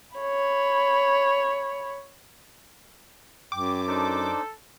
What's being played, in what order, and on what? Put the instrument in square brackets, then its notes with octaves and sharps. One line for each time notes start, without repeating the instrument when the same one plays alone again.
[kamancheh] C#5 B5
[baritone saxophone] F#2 [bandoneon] G5 [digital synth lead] D6
[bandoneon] D4 D#4 C5 [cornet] A4